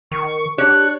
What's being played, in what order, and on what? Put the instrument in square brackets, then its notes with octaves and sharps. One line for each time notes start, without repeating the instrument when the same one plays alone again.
[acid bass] D#3 [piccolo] C#6
[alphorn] D4 [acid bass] G4 [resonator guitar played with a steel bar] C#5 [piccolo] F#6